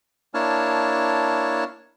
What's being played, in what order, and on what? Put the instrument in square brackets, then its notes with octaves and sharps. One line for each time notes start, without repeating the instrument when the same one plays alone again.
[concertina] A#3 D4 E4 C#5 A5 F6